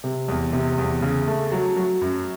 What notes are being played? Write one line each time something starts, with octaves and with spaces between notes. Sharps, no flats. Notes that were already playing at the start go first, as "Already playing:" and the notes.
C3
E2
C3
E2
C#3
A3
F#3
F#3
F#2